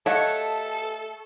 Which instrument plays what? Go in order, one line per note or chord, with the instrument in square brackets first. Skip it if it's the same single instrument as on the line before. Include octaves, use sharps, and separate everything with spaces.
[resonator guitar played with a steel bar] A3 [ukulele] G4 D#5 F5 [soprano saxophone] A4 [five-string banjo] C#5 F#5